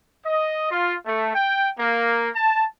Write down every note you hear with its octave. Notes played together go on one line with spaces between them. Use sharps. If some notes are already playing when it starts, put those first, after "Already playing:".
D#5
F4
A3
G5
A#3
A5